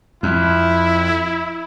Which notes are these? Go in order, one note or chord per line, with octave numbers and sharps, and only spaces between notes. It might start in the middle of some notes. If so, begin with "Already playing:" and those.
F2 E4